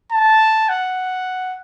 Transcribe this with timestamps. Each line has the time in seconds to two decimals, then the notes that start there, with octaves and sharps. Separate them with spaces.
0.12 A5
0.69 F#5